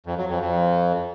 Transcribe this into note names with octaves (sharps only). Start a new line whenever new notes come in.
F2
F#3
F2
F2